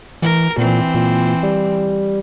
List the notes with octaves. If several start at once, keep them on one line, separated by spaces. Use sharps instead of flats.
E3 A#4
A#2 E3 C4
A#2
G3